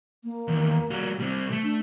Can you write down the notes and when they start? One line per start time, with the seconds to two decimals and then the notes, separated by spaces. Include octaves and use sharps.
0.24 A#3
0.48 E2 D#3
0.90 G3 F#4
1.20 G3 C4
1.51 A3
1.64 D4